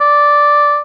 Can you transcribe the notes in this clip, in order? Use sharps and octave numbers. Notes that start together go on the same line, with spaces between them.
D5